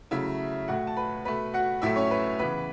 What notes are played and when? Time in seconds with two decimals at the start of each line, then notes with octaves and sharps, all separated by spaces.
0.11 C#3 F#3 A3 E4 E5
0.68 A2 A3 F#4 F#5
0.87 A5
0.97 B4 B5
1.25 B2 A3 B4 B5
1.54 F#4 F#5
1.82 A2 F#3 A3 E4 E5
1.96 C#4 C#5
2.11 B4
2.39 C#3 E3 B3 B4 B5